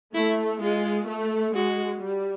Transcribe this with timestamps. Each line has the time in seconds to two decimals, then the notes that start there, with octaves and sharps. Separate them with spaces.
0.14 A3 E4
0.61 G#3 F4
1.07 A3
1.55 G#3 F#4
2.01 G3